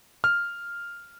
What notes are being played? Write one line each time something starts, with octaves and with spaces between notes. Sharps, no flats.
F6